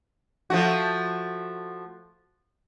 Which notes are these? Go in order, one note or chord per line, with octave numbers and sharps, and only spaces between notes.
F3 A3 F#4